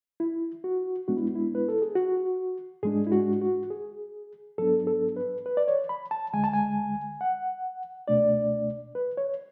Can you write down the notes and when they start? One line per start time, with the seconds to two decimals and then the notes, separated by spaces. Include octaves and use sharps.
0.20 E4
0.64 F#4
1.08 A2 G#3 B3 D4 F#4
1.17 E4
1.35 E4
1.55 B4
1.68 A4
1.82 G#4
1.95 F#4
2.83 G#2 G#3 D4 G#4
3.07 E4
3.12 F#4
3.42 F#4
3.70 G#4
4.58 G#2 F#3 B3 D4 A4
4.87 A4
5.16 B4
5.46 B4
5.57 D5
5.68 C#5
5.89 B5
6.11 A5
6.33 D2 D3 G#3 G#5
6.44 A5
6.54 G#5
7.21 F#5
8.08 C#2 B2 A3 D4 D5
8.95 B4
9.17 C#5